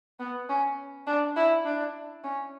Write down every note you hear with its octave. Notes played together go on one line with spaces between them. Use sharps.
B3
C#4
D4
E4
D4
C#4